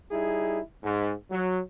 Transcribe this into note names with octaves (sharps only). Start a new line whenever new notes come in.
G3 D#4 E4 G#4
G#2
F#3